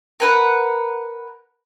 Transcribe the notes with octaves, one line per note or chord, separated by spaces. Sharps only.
A#4 B4 F#5